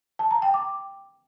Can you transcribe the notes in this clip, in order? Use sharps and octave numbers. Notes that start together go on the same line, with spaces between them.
A5
A#5
G5
D6